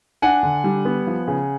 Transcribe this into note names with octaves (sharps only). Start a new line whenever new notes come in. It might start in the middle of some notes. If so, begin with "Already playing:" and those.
D4 F#5 G#5
D3
G3
B3
F3
C#3